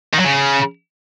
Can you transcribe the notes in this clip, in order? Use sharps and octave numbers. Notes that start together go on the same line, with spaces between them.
D#3
F#3
C#3